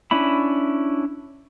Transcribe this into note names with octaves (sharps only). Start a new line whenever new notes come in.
C#4 D4 E4 B5